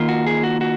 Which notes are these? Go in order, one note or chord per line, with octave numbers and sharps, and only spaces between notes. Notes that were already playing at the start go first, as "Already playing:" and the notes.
Already playing: D#3 A#3 F4
F#4
G#4
F#4
F#4